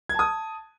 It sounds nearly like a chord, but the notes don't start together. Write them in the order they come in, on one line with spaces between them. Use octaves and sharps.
G#6 A5 D#6